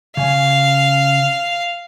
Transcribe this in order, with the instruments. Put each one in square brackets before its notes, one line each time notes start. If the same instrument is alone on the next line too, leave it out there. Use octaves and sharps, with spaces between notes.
[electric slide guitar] C#3 G#5 [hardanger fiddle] F5